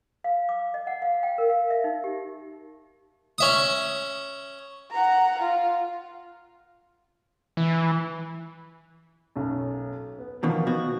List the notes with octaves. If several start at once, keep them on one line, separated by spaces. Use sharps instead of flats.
F5
D6
D#5
F#5
F5
G5
A#4
F5
E5
D#4
G4
C#4 E5 D#6
F#5 A#5
F4
E3
B1 F#2
B3
E2 B2 D#3 F3
B2 F#4